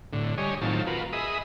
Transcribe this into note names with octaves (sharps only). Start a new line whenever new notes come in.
A2 D3
G3 C#5 D#5 G#5
A2 D#3 F#3 C4 F4 A5
F4 F#4 A#4 B4
G#4 D#5 E5 B5 D#6